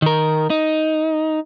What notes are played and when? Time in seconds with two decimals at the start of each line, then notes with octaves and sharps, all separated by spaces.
0.02 D#3 A#4
0.50 D#4